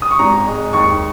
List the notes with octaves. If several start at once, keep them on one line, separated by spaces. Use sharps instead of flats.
D#6
C#6
G#1 A#5
G#3
D#2 C#6